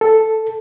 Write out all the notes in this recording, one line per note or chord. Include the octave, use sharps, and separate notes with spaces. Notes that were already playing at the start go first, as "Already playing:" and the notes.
A4